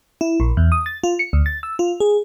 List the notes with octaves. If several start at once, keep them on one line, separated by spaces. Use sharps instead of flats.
E4
A#1
E2
D#6
A6
F4
C#7
D2
A6
E6
F4
G#4